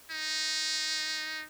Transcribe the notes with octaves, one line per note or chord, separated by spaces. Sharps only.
D#4